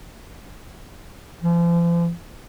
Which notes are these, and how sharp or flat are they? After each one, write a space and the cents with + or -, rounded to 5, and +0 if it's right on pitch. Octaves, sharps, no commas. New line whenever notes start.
F3 -40